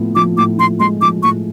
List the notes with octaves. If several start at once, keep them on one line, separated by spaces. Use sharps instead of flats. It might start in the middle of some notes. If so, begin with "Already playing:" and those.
Already playing: A2 F3 B3
F3 D6
A2 D6
F3 C6
G#3 C6
F3 D6
A2 C#6